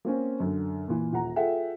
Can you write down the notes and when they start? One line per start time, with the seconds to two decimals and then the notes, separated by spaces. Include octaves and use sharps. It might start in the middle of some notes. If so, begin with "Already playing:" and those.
0.05 A#3 C4 C#4
0.40 F#2 D3
0.88 A#2 E3
1.13 D#1 F#5 A#5
1.36 F4 G#4 A4 E5 F#5 G5